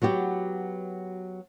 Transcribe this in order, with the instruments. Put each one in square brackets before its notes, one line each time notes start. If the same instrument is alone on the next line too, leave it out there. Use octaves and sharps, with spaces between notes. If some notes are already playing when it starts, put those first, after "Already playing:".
[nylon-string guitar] F#3 B3 F#4 G4